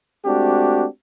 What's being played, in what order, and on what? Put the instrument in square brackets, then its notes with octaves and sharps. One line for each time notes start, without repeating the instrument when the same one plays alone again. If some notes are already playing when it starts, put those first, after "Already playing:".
[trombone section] G#3 A3 C4 D4 F#4 G4